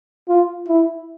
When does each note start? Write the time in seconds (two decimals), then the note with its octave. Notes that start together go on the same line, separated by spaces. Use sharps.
0.29 F4
0.68 E4